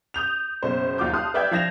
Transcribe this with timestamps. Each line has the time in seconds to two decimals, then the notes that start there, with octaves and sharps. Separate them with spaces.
0.14 D#6 G6 F7
0.63 F#1 B2 C5
0.98 F#1 D#2 F4 F#4 D6 G6
1.13 F5 A5 C6 D#6 F6 F#6
1.34 B4 D5 E5 G5 G6 G#6
1.51 F3 F5 G#6 A#6 E7 F7